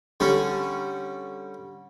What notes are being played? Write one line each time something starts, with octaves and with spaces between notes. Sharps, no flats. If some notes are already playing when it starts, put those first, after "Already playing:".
D3 G3 C#4